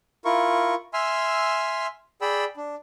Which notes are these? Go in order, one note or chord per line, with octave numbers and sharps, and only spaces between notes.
E4 F4 A#4 C#6
E5 G#5 C6 E6 F6
G#4 D5 G5 B5 E6
D4